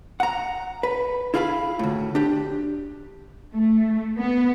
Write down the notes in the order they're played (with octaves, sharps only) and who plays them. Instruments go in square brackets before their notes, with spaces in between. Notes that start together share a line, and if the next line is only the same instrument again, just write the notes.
[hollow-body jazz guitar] F#5 A#5
B4
E4 F4 G#4 F5 A#5 B5
D2 A2
D4 G4
[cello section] A3
B3